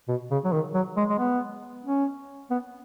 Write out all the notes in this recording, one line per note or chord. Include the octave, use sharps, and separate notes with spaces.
B2
C#3
F#3
D#3
F#3
G#3
G#3
B3
C#4
B3